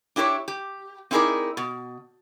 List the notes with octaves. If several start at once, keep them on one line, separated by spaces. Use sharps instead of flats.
D4 E4 G4 C5 C#5
G4
C4 D#4 E4 G#4 A#4 D5
B2